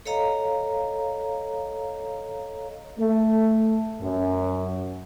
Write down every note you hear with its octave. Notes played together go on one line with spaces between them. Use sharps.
A4 C#5 D#5 F5 A#5
A3
F#2